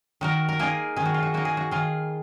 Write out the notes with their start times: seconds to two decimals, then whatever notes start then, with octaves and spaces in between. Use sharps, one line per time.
0.21 D#3 F#4 A#4
0.49 A#4
0.59 A#3 D#4 F4 G#4
0.96 D#3 G#4
1.06 F#4
1.14 F4
1.23 F#4
1.34 A#3 D#4 F#4
1.45 G#4
1.57 F#4
1.71 D#3 F4 G#4